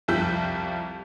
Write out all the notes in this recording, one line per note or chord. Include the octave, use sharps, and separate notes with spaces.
C2 F2 F3 G3 G6 B6